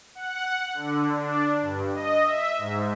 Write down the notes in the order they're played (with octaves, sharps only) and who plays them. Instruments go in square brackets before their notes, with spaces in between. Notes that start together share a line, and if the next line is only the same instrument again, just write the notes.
[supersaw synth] F#5
D3
D4
G2
D#5
E5
G#2